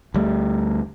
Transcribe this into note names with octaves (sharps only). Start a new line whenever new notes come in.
D2 G3 A3